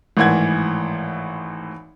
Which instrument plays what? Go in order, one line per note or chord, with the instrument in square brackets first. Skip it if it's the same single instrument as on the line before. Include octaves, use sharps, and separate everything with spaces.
[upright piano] G#1 A2 E3 F#5 G#6